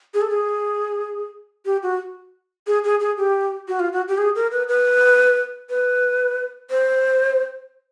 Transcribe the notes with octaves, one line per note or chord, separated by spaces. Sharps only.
G#4
A4
G#4
G4
F#4
G#4
G#4
G#4
G4
F#4
F4
F#4
G4
G#4
A#4
B4
B4
B4
C5